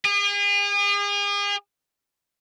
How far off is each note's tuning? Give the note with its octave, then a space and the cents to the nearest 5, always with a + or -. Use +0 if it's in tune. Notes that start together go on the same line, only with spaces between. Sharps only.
G#4 -40